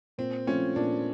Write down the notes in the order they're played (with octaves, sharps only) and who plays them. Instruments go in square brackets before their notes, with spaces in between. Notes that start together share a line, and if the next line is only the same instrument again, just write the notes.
[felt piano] A#2 [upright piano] C4
[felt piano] F3 A3 C4 F4 [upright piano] C#4
[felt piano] A#2 [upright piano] D4